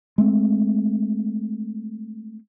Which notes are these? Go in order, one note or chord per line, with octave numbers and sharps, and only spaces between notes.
G#3 A3 C4